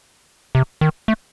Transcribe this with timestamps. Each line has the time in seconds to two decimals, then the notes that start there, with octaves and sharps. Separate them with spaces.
0.55 C3
0.81 D#3
1.08 A3